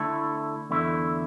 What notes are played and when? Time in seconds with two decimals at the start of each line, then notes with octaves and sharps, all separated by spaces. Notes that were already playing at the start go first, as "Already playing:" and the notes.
Already playing: D3 A3 E4 A4
0.70 E2 D3 A3 E4